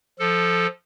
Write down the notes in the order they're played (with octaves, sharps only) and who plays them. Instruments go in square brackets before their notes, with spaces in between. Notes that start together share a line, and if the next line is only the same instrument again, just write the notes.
[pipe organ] F3 A4